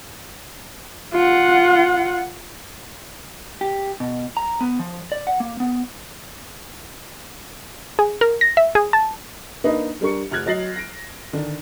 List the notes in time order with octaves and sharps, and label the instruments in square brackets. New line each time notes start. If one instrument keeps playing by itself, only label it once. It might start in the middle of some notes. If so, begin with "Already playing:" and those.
[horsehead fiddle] F4 F#5
[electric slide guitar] G4
B2
A#5
B3
F3
D5
F#5
A#3
B3
[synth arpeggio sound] G#4
A#4
A#6
E5
G#4
A5
[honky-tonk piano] A#3 D4 D#4 B4 D#5
G3 D4 A#4 C#6 C#7
F1 F6 F#6 G#6
F#3 D#5 A6 A#6 C7 F#7
A#6 D7
D3 D#3 D4